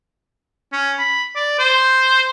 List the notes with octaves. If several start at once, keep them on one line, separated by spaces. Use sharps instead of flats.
C#4
B5
D5
C5